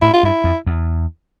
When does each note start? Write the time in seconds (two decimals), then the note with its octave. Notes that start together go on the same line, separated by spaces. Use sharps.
0.02 A2 E4
0.13 F4
0.23 G2 E4
0.44 F2
0.66 E2